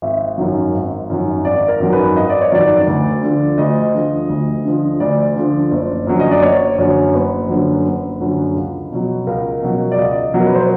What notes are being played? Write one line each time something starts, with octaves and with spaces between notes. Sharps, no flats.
G#1 E5
F#2 D#3 F#3
G#1
F#2 D#3 F#3
G#1 D5
A#4
F#2 D#3 F#3
B4
G#1 D#5
D5
C#5
F#2 D#3 F#3 D5
D2
D3 F3
D2 D#5
D3 F3
D2
D3 F3
D2 D5
D3 F3
F#1
F#2 D3 F#3
D#5
D5
F#1 C#5
F#2 D3 F#3 C#5
F#1 B4
F#2 D3 F#3
F#1
F#2 D3 F#3
C#2
B2 F#3
C#2 A#4
B2 F#3
D5
C#2 D#5
B2 F#3
A#4
B4
C5